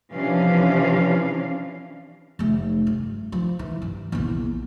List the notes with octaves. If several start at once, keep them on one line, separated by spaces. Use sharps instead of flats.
C3 E3 F3 C#4 D4 F5
F1 A3
G2
F3
E3
G2
A#1 E2